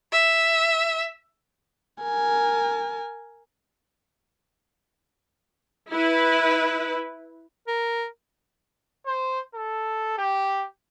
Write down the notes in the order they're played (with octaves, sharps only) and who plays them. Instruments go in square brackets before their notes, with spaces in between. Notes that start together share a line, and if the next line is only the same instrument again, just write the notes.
[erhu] E5
[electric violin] A#4 G#5
[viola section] E4 B4
[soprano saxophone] A#4
[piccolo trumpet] C5
A4
G4